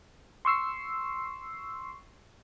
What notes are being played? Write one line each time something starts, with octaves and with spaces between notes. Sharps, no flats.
C6 C#6 E6 C7